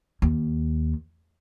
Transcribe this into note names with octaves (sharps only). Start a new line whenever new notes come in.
D#2